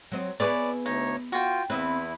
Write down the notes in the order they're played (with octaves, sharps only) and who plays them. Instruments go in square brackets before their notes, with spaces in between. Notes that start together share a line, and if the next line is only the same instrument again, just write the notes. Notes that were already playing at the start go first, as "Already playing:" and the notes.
[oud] F#3 C4 D#5
[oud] B3 E4 G#4 [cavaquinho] B4 C#5 D5
[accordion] D2 C#5 [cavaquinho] D#4
[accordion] F4 [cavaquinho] F#4 G5
[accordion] E2 E4 [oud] C4 D#5 E5 [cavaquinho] B4